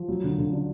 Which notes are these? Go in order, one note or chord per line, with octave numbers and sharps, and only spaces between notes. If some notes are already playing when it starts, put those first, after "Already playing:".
Already playing: F3
F#3
D3
D3
D4